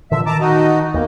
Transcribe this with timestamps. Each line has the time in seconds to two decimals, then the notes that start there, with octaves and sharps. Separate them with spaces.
0.11 A#2 D3 F3 E5
0.26 D#3 A5 A#5 D6
0.40 D#4 F#4 D#5
0.94 D#2 G3 A#3 B3